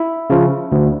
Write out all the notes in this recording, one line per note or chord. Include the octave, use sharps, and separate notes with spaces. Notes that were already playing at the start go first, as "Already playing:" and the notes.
Already playing: E4
C#3 F3
D2